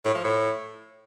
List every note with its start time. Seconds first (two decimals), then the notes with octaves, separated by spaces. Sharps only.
0.05 A2
0.15 F3
0.24 A2